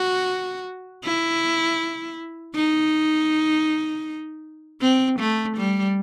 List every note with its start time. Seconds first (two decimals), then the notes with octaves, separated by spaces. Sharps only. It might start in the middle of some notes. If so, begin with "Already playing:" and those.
Already playing: F#4
1.04 E4
2.55 D#4
4.82 C4
5.19 A3
5.57 G3